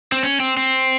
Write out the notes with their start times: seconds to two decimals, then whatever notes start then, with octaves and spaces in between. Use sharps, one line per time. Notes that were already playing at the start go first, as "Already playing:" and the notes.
0.12 C4
0.23 C#4
0.40 C4
0.57 C4